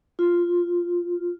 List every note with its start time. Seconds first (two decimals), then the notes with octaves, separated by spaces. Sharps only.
0.19 F4